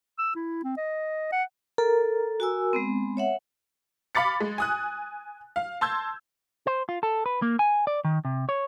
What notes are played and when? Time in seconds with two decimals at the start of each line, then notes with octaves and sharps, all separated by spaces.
0.19 E6
0.35 E4
0.64 C4
0.77 D#5
1.33 F#5
1.78 A4 A#4
2.40 F#4 G#5 E6
2.73 G#3 B3 C4
3.17 C#5 E5 F#5
4.15 F5 B5 D6 A6 C#7
4.40 G#3
4.58 G#5 D#6 F#6
5.56 F5
5.81 A5 C6 E6 G6 G#6
6.67 C5
6.89 F4
7.03 A4
7.26 B4
7.42 A#3
7.59 G#5
7.87 D5
8.04 D#3
8.25 C3
8.49 C#5